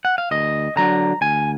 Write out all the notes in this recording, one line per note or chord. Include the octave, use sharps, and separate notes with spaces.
F#5
F5
D2 D#5
D3 F#3 D4 A#5
D2 G#5